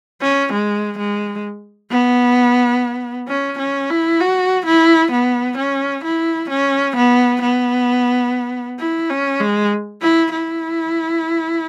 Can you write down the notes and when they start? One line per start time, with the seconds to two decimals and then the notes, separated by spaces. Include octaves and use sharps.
0.22 C#4
0.53 G#3
0.99 G#3
1.91 B3
3.29 C#4
3.59 C#4
3.90 E4
4.20 F#4
4.66 E4
5.12 B3
5.58 C#4
6.04 E4
6.50 C#4
6.96 B3
7.42 B3
8.80 E4
9.10 C#4
9.41 G#3
10.01 E4
10.33 E4